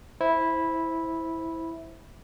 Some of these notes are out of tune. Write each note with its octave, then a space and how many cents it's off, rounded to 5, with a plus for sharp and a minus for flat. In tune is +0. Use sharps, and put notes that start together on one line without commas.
E4 -10 C5 +0